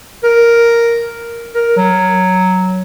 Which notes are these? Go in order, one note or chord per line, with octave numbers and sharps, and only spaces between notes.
A#4
A#4
F#3